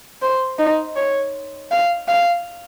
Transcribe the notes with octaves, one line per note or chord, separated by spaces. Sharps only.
C5
D#4
C#5
F5
F5